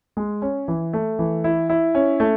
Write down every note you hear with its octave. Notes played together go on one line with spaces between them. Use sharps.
G#3
C#4
E3
A3
E3
E4
E4
C#4
A3